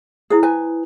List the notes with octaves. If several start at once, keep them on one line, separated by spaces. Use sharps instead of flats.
E4 G#4 C5 D#6
B4 G#5